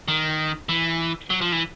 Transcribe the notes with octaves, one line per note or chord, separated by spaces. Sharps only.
D#3
E3
F#3
F3
E3